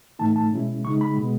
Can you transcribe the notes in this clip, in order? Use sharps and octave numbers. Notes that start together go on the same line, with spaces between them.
A2 E3 A3 D#4 A5
A5
B2 G#3 C#4 E4
C#3 G#3 D#4 C#6
B5
B2 G#3 B3